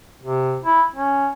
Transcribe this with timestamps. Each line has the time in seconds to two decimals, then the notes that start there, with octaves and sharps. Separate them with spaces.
0.21 C3
0.64 E4
0.95 C#4